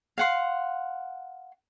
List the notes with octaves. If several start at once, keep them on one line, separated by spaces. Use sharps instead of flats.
F5 F#5 C6